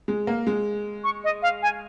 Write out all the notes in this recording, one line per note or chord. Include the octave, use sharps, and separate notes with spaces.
G#3
A#3
G#3
C#6
D#5
F5
G#5